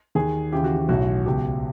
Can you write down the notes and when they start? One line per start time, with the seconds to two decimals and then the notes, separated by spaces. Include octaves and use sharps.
0.15 D#2 D#3 G#4
0.52 D#2 C#3 E3 G4
0.64 F#4
0.77 F#4
0.89 B1 A2 E3 F#4
1.26 C#2 B2 G4